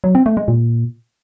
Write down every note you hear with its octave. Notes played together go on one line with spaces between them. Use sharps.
F#3
C4
A3
G#3
A#2